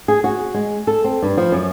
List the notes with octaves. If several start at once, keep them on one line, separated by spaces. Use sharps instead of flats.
G#4
F#4
G#3
A4
C4
G2
F3
F#2